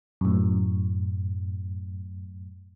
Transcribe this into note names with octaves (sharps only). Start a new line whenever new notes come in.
F#2 A2